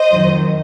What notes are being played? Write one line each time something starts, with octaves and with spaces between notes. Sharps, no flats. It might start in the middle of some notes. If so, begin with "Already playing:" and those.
Already playing: C5 D#5
F2 D#3 F#3